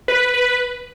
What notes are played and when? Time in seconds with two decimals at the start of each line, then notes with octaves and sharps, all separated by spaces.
0.08 B4
0.34 B4